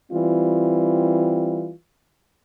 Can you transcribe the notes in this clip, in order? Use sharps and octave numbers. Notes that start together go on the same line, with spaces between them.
E3 G3 C4 F4